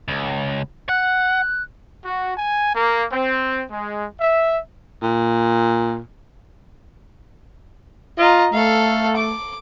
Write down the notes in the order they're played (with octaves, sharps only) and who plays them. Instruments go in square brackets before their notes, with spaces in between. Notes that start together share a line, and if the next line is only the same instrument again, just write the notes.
[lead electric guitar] C#2
[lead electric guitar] F#5 [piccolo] F#6
[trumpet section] F#4
G#5
A#3
C4
G#3
E5
[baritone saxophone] A#2
[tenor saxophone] F4 [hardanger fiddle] D#5 A#5
[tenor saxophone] A3 [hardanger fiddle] A4 F5
[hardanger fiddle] D6